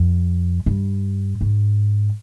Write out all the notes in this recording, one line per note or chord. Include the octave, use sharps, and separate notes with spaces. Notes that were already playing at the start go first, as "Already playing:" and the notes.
Already playing: F2
G2
G#2